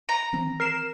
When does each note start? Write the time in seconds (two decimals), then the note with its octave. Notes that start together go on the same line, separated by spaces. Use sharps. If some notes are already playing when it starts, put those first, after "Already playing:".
0.09 A#5
0.33 D#3 E3 C4
0.60 A#4 C7 E7